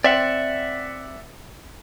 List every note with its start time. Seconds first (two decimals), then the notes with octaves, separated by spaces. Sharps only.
0.04 C4 D5 E5 F#5